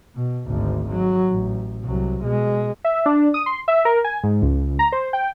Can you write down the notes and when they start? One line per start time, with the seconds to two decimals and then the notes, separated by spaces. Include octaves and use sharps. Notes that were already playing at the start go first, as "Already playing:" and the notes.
0.16 B2
0.48 G#1 D2
0.91 F#3
1.30 A1
1.84 C2 F#3
2.24 B2 G#3
2.85 E5
3.06 D4
3.34 D#6
3.46 C6
3.68 E5
3.85 A#4
4.04 G#5
4.23 G#2
4.42 C#2
4.79 A#5
4.92 C5
5.13 G5